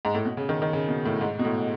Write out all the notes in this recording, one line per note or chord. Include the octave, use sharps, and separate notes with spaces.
G#2
A2
B2
C#3
D#3
D#3
C#3
B2
A2
G#2
B2
A2